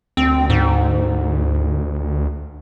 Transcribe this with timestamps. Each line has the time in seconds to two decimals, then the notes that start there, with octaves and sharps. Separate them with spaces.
0.17 D2 C4
0.50 G#2